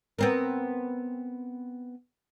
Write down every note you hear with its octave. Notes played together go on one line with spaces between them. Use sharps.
B3 C4 A#4